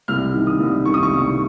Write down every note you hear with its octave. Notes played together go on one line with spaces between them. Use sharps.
C2 F6
D#3
D#6
C2
D#3 C#6
D#6
C#6
C2
C#6